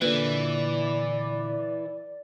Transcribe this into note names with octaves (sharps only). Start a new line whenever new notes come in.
A#2 D3 E3 B4 D5